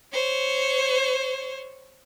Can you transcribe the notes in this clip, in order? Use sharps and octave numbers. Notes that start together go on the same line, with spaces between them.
C5 C#5